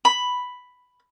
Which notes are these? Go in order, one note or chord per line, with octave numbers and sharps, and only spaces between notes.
B5